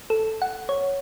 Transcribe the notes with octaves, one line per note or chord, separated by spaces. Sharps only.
A4
F#5
C#5